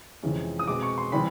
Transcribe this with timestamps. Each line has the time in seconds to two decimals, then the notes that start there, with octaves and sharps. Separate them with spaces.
0.23 F2 C3 E3 G#3 C#4
0.59 D#6
0.67 B2 G#3 C4 D6
0.83 C#6
0.98 C6
1.12 C3 E3 G3 B5